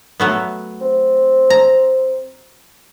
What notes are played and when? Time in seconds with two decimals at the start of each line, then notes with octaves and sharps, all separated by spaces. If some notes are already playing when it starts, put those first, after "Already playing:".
0.20 F#3 A3 B3
0.81 C4
1.50 A#5